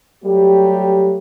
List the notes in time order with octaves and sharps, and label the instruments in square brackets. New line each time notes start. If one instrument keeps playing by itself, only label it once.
[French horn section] F#3 G3 A3 G4